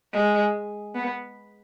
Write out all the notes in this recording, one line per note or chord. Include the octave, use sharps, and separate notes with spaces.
G#3
B3